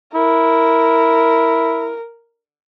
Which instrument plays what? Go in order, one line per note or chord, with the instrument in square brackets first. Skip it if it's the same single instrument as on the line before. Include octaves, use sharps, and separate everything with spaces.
[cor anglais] E4 [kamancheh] A#4